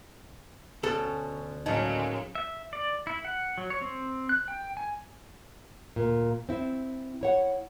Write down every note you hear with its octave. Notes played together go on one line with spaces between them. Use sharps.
D2 B2 C#4 A4
A2 C#3 F#3 G#3 A#3 D#4 D#5
E5
D5
E4
F#5
F#3
C#5
C4
F#6
G5
G#5
D2 A#2
C4 E4
E4 C#5 F#5